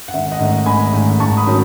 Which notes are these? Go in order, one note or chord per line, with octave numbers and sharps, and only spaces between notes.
F#5
G#1 E5
D#5 F#5
G#2 D#3 A3
G#1 G#5 B5
G#2 D#3 A3
G#2 A5 C#6
B5 D#6
D#3 F#3 C#4